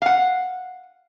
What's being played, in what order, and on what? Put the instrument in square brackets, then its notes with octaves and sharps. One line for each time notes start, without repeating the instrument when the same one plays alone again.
[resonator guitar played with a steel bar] F5 F#5